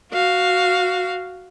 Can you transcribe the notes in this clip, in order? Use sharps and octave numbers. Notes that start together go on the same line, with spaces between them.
F#4 F5